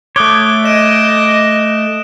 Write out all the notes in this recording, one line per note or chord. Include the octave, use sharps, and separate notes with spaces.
A3 C#5 D6 D#6 F#6 G7
D#5 D7 E7